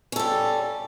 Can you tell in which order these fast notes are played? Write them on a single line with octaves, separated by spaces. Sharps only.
C#4 A4 G3